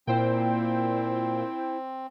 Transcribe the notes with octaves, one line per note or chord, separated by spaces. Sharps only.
A#2 C4 E4 C5 G5